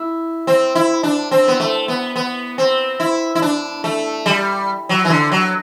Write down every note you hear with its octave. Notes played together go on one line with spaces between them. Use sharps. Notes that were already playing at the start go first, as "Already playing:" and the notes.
Already playing: E4
C4
E4
D4
C4
B3
A3
B3
B3
C4
E4
E4
D4
A3
G3
F#3
E3
D3
F#3